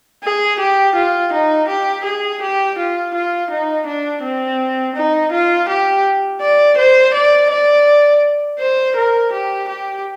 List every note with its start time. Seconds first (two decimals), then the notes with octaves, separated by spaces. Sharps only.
0.24 G#4
0.60 G4
0.96 F4
1.33 D#4
1.69 G4
2.05 G#4
2.42 G4
2.78 F4
3.14 F4
3.51 D#4
3.87 D4
4.23 C4
4.96 D#4
5.32 F4
5.69 G4
6.41 D5
6.78 C5
7.14 D5
7.51 D5
8.59 C5
8.96 A#4
9.32 G4
9.69 G4